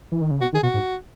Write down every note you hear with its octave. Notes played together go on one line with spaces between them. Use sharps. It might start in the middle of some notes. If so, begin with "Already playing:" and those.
E3
D#3
C#3
B2 F#4
D#3 G#4
B2 F#4
G#2